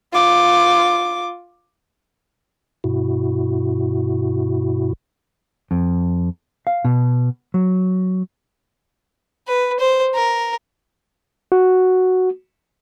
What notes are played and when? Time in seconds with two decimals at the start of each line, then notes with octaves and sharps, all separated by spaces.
0.13 F4 D6
2.84 G2 B2 E4 F#4
5.71 F2
6.67 F5
6.85 B2
7.54 F#3
9.48 B4
9.80 C5
10.15 A#4
11.52 F#4